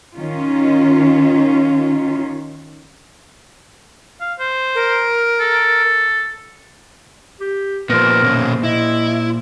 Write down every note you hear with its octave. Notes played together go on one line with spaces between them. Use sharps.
D#3 C#4 F4
F5
C5
A#4
A4
G4
A#2 F3 B3 A#4 C5
B2 C#4
E4 D#5